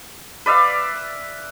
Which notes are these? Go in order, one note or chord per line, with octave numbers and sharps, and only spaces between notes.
B4 D5 E5 F5